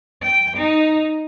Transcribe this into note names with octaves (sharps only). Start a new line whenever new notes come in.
G5
D#4